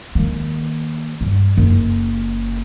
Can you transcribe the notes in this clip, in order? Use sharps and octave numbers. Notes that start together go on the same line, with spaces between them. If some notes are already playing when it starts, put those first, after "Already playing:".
D#3 A#3
G2
F#1